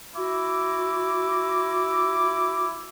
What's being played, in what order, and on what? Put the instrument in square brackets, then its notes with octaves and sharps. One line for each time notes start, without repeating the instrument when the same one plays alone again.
[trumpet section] E4 D6 [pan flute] F#4